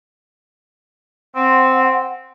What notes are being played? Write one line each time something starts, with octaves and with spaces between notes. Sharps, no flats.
C4 F#5